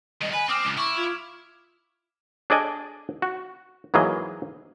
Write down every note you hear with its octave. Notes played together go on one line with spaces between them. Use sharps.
G2 D#3 D#5
B4 G#5
C4 D6 D#6 F6 E7
C#2
E4 C#6 D6 D7
F4 G#6 F7
D4 G#4 A4 D5 D#5 G#5
F#4
G#2 E3 F#3 A#3 G#4 D#5